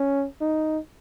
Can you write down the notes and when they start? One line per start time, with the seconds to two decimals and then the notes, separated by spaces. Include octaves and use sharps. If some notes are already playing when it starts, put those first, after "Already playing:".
Already playing: C#4
0.41 D#4